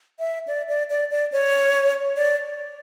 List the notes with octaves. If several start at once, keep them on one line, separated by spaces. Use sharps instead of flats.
E5
D5
D5
D5
D5
C#5
D5